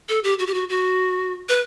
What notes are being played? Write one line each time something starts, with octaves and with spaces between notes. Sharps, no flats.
A4
G4
F#4
G4
F#4
F#4
B4